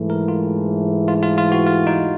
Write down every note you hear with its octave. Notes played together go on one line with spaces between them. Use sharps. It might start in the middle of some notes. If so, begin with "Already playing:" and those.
Already playing: G#2 E3 A3
A#4
F4
F4
F4
F4
F#4
F4
D#4